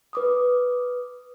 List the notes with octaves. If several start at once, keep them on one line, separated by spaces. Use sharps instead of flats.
B4 D6 D#6